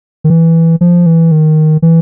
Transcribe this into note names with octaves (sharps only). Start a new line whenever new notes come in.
D#3
E3
F3
E3
D#3
E3